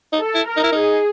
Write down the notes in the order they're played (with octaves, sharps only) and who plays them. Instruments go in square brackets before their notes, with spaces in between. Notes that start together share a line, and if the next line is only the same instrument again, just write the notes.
[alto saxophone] D#4
[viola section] A4
[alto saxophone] E4
[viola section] A#4
[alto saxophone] D#4
E4
D#4
[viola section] G#4